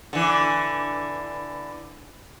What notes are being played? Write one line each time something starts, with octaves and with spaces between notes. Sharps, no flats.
D3 E3